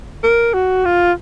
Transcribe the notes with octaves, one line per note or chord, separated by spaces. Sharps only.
A#4
F#4
F4